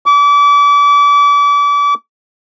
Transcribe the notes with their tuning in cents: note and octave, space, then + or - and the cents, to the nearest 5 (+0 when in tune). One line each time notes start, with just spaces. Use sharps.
D6 -35